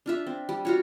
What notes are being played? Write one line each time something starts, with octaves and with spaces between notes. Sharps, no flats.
D4 F4 E5
C4
G3
F4 F#4 C#5